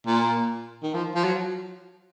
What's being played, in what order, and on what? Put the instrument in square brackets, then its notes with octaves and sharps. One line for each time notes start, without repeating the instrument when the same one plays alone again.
[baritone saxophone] A#2
D#3
F3
F3
F#3